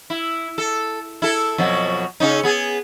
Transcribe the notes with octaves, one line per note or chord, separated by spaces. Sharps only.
E4
A4
E4 A4
F2 B2 F#3
C#3 C#4 D#4
B3 G#4